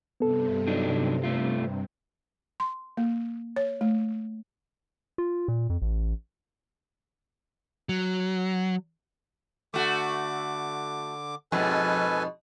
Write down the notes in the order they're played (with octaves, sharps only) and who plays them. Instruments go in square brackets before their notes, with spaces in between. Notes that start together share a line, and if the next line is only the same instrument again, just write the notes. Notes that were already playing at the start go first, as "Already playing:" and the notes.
[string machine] G2 C3 [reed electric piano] B3 A4
[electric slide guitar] F#3 D4 D#4
A3 F4
[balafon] C6
A#3
C#5
A3
[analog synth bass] F4
A#2
F2
A1
[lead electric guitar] F#3
[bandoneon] D3 D6 [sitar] A3 F#4
[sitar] F2 G#2 B2 [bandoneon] A4 B4 G#5